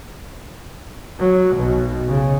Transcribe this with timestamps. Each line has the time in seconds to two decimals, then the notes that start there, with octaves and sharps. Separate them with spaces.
1.19 F#3
1.56 B1 B2
2.08 C#3